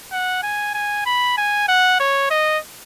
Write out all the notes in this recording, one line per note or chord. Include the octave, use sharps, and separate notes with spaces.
F#5
G#5
G#5
B5
G#5
F#5
C#5
D#5